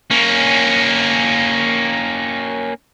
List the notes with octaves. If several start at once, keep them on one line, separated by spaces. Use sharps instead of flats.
A#3 C#4